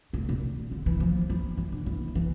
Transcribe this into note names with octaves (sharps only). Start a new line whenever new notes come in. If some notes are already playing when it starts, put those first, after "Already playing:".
A2
A#2
D3
E3
F3
E3
E3
D3
E3
E3